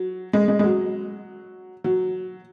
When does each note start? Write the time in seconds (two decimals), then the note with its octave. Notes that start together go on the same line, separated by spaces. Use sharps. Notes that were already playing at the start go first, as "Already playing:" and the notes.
Already playing: F#3
0.33 G#3
0.48 G#3
0.59 G#3
0.64 F#3
1.84 F#3